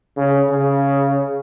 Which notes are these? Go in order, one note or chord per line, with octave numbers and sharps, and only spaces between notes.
C#3
C#3